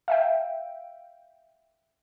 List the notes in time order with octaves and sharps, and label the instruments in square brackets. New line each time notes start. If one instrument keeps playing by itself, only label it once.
[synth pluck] E5 F5 G5